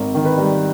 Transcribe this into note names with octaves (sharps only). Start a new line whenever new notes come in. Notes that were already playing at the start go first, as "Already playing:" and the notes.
Already playing: G#1 A#4
D#3
B4
G3